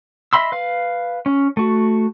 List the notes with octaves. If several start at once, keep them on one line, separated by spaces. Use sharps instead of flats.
D#5 E5 B5 C6 E6
B4 F5
C#4
A3 F#4